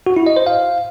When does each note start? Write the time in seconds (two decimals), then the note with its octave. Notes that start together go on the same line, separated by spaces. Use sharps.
0.07 F#4
0.17 E4
0.27 D#5
0.37 C5
0.47 F5